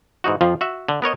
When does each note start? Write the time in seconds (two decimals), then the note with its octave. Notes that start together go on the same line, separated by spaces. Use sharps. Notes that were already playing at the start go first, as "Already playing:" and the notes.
0.24 G#2 E3 D#4 F#4
0.41 F2 F3 F4
0.61 F#4 E5
0.88 D3
1.02 B3 A#4 C#5 D#5